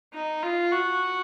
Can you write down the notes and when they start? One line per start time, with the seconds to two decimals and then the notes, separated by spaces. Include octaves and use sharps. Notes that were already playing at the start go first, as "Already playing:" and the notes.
0.14 D#4
0.43 F4
0.72 F#4